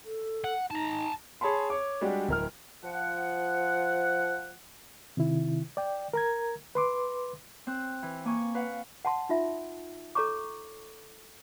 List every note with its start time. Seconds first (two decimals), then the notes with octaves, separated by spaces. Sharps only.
0.05 A4
0.44 F#5
0.70 D#4 A5 A#5
1.41 G#4 C#5 A5 B5 C6
1.70 C#5 D6
2.01 G3 G#3 D4 F#4 G4
2.28 D1 A#4 F6
2.84 F3 F#5
5.17 C3 D#3 E4
5.77 D5 G5
6.13 A#4 A#5 G#6
6.75 B4 C6 D6
7.67 C4 F#6
8.03 E3
8.25 A#3 G#5 C#6
8.55 B4 F5 F#5
9.05 F#5 A5 C6
9.29 D#4 F4 E5
10.15 A4 C#5 A#5 C#6 D6